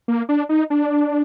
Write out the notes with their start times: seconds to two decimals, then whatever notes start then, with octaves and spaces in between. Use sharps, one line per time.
0.08 A#3
0.29 D4
0.49 D#4
0.70 D4